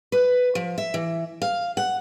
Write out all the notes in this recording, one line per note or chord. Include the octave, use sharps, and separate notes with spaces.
B4
F3
E5
E3
F5
F#5